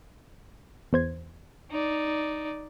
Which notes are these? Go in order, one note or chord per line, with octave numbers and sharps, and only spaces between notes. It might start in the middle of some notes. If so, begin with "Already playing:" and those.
E2 C5 G#6
D#4 D5